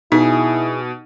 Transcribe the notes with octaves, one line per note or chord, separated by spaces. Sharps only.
B2 D#4 E4 G#4